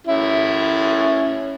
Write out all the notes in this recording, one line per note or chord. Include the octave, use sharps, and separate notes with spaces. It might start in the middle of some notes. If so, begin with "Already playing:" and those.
C#4 E4